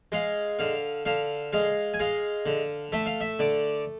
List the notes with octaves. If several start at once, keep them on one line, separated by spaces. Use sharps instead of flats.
G#3 F5
D3 F5
D3 F5
G#3 F5
G#5
G#3 F5
D3
A3 E5
F5
E5
D3 D5